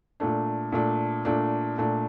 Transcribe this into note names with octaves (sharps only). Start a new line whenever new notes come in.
A#2 A3 D4
A#2 A3 D4
A#2 A3 D4
A#2 A3 D4